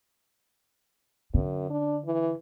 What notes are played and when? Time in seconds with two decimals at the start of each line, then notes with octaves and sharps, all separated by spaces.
1.34 F#2 D3
1.70 D4
2.05 E3